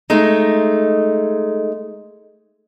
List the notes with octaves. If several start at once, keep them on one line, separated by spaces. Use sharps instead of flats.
G#3 A3 D#4